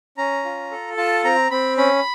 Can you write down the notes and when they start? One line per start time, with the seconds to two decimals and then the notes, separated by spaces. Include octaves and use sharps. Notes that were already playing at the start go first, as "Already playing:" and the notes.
0.17 C#4 A#5
0.45 F4
0.71 A4
0.97 F4 A5
1.24 C4 A#5
1.51 C4 B5
1.77 C#4 B5